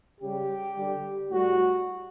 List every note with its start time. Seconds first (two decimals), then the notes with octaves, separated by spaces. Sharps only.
0.21 C#3 G3 G4
0.76 D3 G3
1.29 A2 G3 F#4